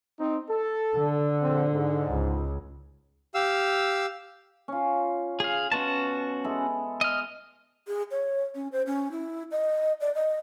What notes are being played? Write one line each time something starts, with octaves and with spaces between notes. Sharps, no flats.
C4 D#4
A4
D3
A#1 C4
G#2
C#2
G4 F5 E6
C#4 F4
G#4 F5
B2 C#4 F#4 A5 C6
G#3 E4 A4
D#5 F6
G#4
C#5
C#4
C5
C#4
E4
D#5
D5
D#5